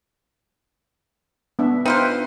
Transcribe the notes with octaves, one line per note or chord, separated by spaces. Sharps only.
B3 D4 E5
D#4 F4 B4 C5 E5 G5